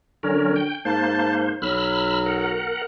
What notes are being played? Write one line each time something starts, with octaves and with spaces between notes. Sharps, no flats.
D3 F#3 C#4 A#4
G5
G#2 A#3 C5 A5
B1 F#3 B5 E6 F6
A#4 F#5